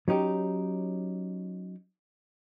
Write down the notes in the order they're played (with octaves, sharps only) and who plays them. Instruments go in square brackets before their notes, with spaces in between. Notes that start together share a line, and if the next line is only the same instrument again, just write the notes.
[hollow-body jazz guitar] F#3 C#4 D#4 G4